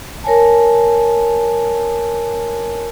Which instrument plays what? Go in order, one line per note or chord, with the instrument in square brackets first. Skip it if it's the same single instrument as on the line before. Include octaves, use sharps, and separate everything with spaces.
[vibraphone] A#4 C#5 G#5 A5